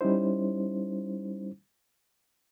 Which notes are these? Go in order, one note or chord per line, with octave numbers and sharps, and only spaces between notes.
G3 C#4 D#4 E4 C5